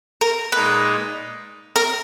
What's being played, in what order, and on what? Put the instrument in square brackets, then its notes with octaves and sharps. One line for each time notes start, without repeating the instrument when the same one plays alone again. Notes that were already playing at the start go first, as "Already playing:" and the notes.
[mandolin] A#4
[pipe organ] A#2 G#3 D#4 [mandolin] B4
[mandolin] A#4